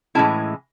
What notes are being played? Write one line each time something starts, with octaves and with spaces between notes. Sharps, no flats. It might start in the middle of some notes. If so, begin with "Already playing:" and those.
A2 E3 G#3 C#4 E4 A5